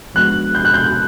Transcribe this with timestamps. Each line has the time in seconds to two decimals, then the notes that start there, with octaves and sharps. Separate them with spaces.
0.15 F3 G#3 B3 D4 F#4 F#6
0.55 G6
0.65 F#6
0.74 G6